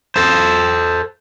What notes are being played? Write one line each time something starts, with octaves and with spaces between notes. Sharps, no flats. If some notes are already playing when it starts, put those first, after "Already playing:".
A4 C5